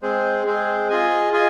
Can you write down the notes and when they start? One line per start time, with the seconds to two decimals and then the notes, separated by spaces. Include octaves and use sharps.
0.02 G#3 C4 G#4 C5
0.46 G#3 C4 G#4 C5
0.89 F4 G#4 D#5 G#5
1.32 F4 G#4 D#5 G#5